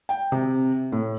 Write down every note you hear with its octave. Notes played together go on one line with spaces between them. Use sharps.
G5
C3
A2